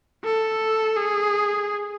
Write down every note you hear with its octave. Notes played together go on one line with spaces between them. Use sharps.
A4
G#4